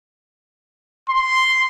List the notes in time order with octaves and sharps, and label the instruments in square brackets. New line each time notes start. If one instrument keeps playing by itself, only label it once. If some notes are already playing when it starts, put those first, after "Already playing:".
[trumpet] C6